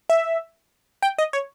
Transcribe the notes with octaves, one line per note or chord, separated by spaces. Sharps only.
E5
G5
D#5
C#5